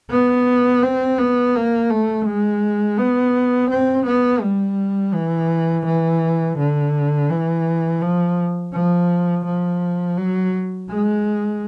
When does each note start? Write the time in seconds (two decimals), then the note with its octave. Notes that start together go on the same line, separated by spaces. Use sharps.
0.10 B3
0.82 C4
1.18 B3
1.55 A#3
1.90 A3
2.26 G#3
2.98 B3
3.70 C4
4.06 B3
4.41 G3
5.14 E3
5.86 E3
6.58 D3
7.30 E3
8.01 F3
8.73 F3
9.45 F3
10.17 F#3
10.89 G#3